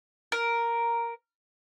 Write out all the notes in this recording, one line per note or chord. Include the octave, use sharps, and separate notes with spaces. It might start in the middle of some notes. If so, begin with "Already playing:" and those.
A#4